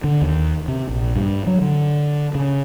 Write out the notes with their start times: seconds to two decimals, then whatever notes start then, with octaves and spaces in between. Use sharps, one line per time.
0.04 D3
0.22 D#2
0.68 C3
0.89 A#1
1.16 G2
1.47 F#3
1.61 D3
2.35 C#3